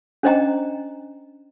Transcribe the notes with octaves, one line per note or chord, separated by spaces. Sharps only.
C#4 D4 C5 D#5 G5 A#5